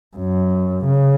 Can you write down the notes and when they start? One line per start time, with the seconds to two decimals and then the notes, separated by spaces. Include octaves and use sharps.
0.17 F#2
0.85 C#3